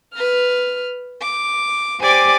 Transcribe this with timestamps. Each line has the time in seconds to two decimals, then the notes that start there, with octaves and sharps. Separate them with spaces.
0.16 B4 F6
1.21 D6
2.00 G4 C5 D5 G#5 D6